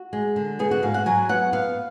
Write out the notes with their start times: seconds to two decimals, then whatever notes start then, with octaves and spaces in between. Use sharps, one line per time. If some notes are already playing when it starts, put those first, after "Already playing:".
Already playing: F#4
0.13 G#3
0.36 D3
0.59 B3 G#4
0.71 F#4
0.82 G#2 F5
0.94 F#5
1.06 F#3 G#5
1.29 B3 F#5
1.53 B3 F5